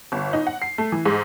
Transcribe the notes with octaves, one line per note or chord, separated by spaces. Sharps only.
G1
D#4
F#5
C7
A3
E3
G#2